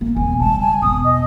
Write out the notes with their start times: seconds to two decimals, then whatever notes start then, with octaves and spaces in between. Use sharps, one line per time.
0.01 A#3
0.16 E1 F3 G#5
0.40 C#3 G3 A5
0.61 G#5
0.82 E1 D#6
1.04 D#5